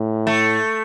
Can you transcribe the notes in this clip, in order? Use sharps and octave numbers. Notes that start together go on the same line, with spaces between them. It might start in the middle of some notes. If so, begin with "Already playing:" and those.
Already playing: A2
A3